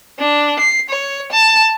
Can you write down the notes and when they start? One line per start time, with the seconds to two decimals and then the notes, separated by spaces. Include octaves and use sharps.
0.19 D4
0.59 C7
0.89 C#5
1.32 A5